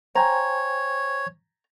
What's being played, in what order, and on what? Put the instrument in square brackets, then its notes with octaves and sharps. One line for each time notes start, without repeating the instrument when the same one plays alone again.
[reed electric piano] C5 G5 G#5 [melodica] C#5 [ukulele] A#5